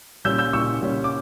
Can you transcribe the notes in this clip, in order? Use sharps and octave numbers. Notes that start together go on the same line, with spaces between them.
A#2 G3 C#4 E6 G6
E6 G6
A#2 G3 C#4 C#6 E6
A#2 G3 C#4
D6